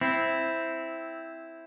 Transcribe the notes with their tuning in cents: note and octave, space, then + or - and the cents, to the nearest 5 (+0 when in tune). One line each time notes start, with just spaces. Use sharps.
C4 +0 E4 +0